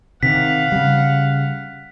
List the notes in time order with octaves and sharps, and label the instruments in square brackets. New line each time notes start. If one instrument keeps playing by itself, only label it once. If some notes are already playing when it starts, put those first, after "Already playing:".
[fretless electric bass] C3 D#3 [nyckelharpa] F5 F#5 [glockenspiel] B6
[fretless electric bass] C#3 G3